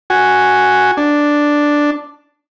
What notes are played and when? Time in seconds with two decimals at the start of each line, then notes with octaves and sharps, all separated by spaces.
0.10 F#4 G#5
0.97 D4